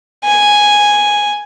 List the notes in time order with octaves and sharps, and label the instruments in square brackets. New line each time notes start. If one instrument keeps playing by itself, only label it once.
[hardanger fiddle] G#5